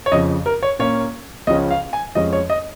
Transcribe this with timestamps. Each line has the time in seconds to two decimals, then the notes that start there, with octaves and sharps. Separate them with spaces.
0.06 C#5
0.11 F2 C#3 F3 D#5
0.46 A#4
0.63 C#5
0.79 A#2 A#3 C#4 C#5
1.47 C#2 C#3 F3 C#4 D#5
1.70 F5
1.93 G#5
2.15 F2 F3 G#3 C#4 D#5
2.33 C#5
2.50 D#5